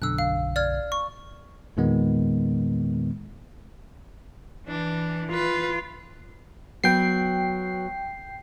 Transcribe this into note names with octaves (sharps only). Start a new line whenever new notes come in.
B1 F#2 D3 E6 F#6
F5
D5 F6 G#6
C#6
E2 A#2 D#3 G#3 B3
E3 D4
F4 B4
F#3 B3 G5 C7